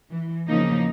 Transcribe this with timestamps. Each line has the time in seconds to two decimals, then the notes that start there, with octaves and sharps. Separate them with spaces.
0.11 E3
0.49 E2 C#3 F3 A#3 D#4